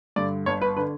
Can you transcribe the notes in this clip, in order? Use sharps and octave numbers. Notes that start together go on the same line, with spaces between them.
G2 D3 D5
G1 C#5
B4
D3 B4